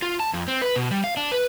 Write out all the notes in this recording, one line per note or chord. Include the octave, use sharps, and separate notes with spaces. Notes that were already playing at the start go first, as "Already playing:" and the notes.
F4
A5
F2
C4
B4
B2
G3
F5
D4
B4